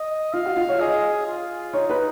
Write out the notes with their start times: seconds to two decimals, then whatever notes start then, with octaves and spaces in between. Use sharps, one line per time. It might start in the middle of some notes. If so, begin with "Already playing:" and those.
Already playing: D#5
0.33 F4 F5
0.46 F#4
0.56 F4
0.69 C#5
0.80 G#4 D#5
1.27 F4
1.74 D#4 C#5
1.90 B4